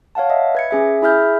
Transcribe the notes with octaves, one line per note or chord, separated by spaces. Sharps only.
C#5 F5 F#5 A5
D#5 E5
B4 G#6 C#7
C#4 G#4 E5
E4 G#4 E5 F6 G6